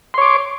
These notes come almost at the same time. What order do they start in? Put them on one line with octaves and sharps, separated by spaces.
C6 C#5 D6